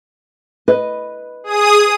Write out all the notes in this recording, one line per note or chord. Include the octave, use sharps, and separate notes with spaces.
B4 D#5
G#4 D#6